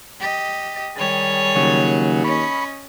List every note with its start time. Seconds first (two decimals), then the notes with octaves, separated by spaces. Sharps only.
0.20 G4 D#5
0.96 D#3 G3 G#4 C#5
1.55 D#2 C#3 F#3
2.24 C#4 D#5 B5 C#6